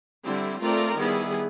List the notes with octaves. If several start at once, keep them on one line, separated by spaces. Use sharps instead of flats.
D3 G3 C4 E4
A3 C4 F4 A#4 D5
D#3 G3 B3 E4 G#4